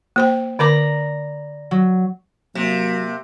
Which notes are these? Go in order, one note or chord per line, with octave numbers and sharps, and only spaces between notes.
A#3 C5 G5
D3 A#4 D5 A#5 B5 D6
F#3
C3 F#3 A#3